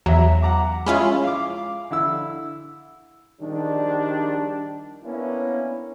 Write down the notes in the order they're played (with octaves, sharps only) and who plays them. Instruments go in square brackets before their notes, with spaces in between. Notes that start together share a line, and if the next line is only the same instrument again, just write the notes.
[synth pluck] E2 F#3 [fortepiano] E5 A#5
[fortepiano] F#5 A#5 D6
[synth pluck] G#3 C#4 F4 [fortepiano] E4 E5 B5
[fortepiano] F5 D6
D3 E4 E6
[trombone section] A#1 D#3 G3 D4
A#3 B3 C#4 D4 E4